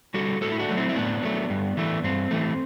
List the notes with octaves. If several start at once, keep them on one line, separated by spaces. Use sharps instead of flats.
D3 G3 F#4 A4
A2 F#4 A4
E4
D4 F#4
F#3 A3
C4 E4
E4
A2 B3 D4
F#3 A3
G2
E3 A3
G2 C4
E3 A3